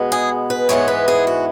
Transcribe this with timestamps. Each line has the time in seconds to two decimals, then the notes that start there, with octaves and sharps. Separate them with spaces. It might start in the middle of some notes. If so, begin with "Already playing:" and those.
Already playing: B2 G#3 B3
0.12 G#4
0.50 B4
0.69 G#2 E3 G#3 B3 C#5
0.88 B4
1.08 G#4
1.27 F#4